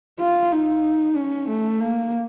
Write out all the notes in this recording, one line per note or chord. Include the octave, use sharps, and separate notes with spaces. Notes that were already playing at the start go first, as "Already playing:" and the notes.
F4
D#4
C#4
A3
A#3